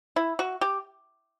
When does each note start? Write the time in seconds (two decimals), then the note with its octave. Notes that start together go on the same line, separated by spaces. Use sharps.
0.16 E4
0.39 F#4
0.61 G4